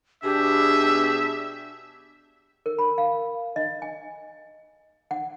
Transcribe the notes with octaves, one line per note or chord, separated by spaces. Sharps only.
B2 D4 G4 G#4 E5
A#4
B5
F5
D#5
G#5
F#5